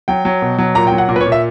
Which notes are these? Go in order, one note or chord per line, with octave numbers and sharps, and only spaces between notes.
F#3 G5
F#3
B2
F#3
A#2 A#5
G5
F#3
F#5
A#2 A#4
B4
C#5
A#2
E5